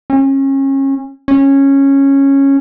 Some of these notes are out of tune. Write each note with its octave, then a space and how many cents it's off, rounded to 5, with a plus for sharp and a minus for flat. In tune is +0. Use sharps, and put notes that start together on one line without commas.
C#4 -30
C#4 -10